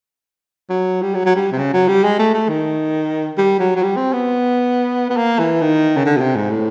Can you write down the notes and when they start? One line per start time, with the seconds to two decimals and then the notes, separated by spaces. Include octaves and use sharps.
0.70 F#3
1.02 G3
1.14 F#3
1.26 F#3
1.36 G3
1.52 C3
1.58 C#3
1.74 F#3
1.88 G3
2.04 G#3
2.19 A3
2.34 A3
2.49 D#3
3.38 G3
3.60 F#3
3.76 F#3
3.83 G3
3.97 C4
4.13 B3
5.10 B3
5.17 A#3
5.39 E3
5.61 D#3
5.97 C#3
6.06 D3
6.17 B2
6.21 C3
6.36 G#2
6.50 A2